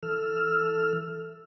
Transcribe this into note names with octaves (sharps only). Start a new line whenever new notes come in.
E3 A4 E6 F6